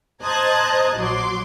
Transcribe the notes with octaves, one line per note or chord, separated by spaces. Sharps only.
C5 D#5 A5 A#5 F#6 G#6
A#1 F#3 C6 D6